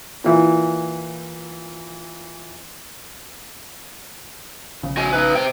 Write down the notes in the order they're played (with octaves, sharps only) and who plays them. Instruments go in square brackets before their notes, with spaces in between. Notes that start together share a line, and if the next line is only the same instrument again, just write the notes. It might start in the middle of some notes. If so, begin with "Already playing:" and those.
[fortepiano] A#2 E3
[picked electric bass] A#1 C#3
[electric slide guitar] F#4 D#5 G#5
D#4 B4
C3 G5